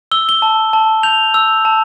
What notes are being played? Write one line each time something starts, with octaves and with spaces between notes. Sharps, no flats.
E6 G7
G7
A5
A5
G6 F7
E6
A5